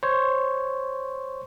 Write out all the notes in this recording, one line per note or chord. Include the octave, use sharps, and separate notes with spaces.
C5 C#5